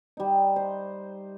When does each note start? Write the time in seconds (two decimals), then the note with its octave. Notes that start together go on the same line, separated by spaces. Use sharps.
0.17 G3 D#4
0.56 C5